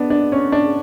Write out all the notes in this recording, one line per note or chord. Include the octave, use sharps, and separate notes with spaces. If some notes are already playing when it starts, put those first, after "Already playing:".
Already playing: B3 D4
D4
C#4
D4